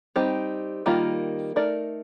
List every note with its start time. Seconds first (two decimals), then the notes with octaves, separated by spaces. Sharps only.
0.16 G3 C4 D#4 G4
0.86 D#3 G3 A#3 F4
1.56 A3 D#4 A#4 D5